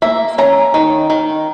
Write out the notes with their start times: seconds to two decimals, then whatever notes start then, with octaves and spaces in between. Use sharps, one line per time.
0.02 A#3 E5
0.38 C#4 A#5
0.74 D#3
1.10 D#3